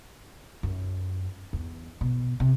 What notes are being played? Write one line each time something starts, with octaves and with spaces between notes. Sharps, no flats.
F#2
E2
B2
C3